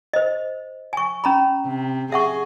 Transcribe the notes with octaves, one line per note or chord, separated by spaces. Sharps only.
C5 D#5
G#5 C#6
C#4 A#5 B5
C3
G#4 E5 F#5 C#6